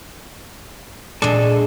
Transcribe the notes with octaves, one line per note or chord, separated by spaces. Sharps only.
A#2 G#3 D4 A4